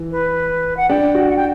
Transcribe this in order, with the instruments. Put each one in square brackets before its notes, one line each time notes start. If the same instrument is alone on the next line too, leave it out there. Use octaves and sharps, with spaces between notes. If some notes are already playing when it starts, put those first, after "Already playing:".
Already playing: [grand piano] E3
[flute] B4
F#5
[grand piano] D4 [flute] G5
[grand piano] F#4
[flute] F#5
G5